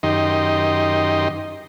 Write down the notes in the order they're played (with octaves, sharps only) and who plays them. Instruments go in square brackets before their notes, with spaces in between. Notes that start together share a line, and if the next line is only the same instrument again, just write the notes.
[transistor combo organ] F#2 D#3 D#4 G4 D#5 C6